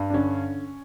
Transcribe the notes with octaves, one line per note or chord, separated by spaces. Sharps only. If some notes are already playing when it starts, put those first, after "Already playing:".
Already playing: G2
D4
D3 C#4